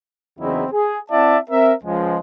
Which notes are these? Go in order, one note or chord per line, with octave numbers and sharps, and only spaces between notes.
E2 C#3 F#3 C4 D#4 E4
G#4
C4 E4 D5 E5 F#5 A5
C4 A#4 E5
C#2 F3 G#3